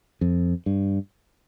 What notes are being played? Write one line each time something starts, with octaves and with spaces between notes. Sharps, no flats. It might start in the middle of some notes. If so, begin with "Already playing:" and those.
F2
G2